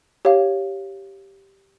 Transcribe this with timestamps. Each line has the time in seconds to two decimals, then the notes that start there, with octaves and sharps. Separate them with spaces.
0.25 G4 C#5 F5